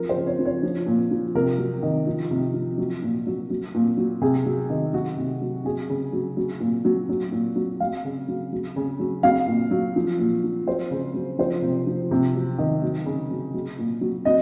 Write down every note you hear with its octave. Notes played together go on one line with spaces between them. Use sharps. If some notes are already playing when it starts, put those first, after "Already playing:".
Already playing: F3 F#3 A#4
C5
C#3
C#5
F3
C#5
F3
A#2
F3
C3 A#4
F#3
D#3
F3
C3
F3
F#3
A#2
F#3
F#3
A#2
F#3
C3 G#4
F#3
D#3
F#3 F#4
C3
F#3
F#3 G#4
C#3
F#3
F#3
A#2
F#3
F#3
A#2
F#3
F#3 F5
C#3
F#3
F#3
C#3
F#3
F#3 F5
A#2
F#3
F3
A#2
F3
F#3 C5
C#3
F#3
F3 C5
C3
F3
C3
F#3
D#3
F#3
C#3
F#3
F#3
A#2
F#3
F#3 D#5